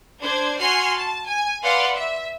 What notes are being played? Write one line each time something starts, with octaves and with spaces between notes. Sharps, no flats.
D4 C5 G#6
F#4 G#5 C6 F6 C7
A5
G#5
B4 D5 F5 F#5 C6
E5